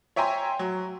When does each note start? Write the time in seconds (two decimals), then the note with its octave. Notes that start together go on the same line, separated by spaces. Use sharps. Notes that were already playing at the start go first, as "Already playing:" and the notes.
0.16 C#5 E5 G5 G#5 A#5 C6
0.59 F#3